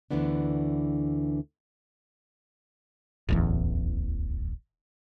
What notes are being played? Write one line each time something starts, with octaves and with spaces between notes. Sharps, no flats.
D2 D3 E3 B3 D4
D1 A1 E2